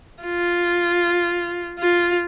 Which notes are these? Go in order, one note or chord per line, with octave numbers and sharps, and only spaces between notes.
F4
F4